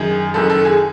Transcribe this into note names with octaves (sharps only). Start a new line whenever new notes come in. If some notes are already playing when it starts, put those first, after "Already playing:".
Already playing: F#2 D#3 G#4
F#1 F#2 D#3 A4
A4
G#4